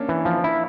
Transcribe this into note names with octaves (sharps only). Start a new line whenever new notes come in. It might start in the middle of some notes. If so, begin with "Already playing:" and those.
Already playing: A#3 C#4 D4
E3
F3
E4